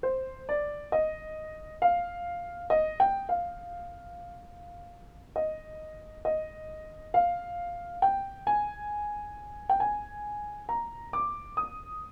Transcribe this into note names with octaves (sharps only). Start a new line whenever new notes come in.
C5
D5
D#5
F5
D#5
G5
F5
D#5
D#5
F5
G5
G#5
G5
G#5
A#5
D6
D#6